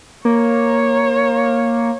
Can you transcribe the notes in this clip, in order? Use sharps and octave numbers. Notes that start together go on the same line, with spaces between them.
A#3 C#5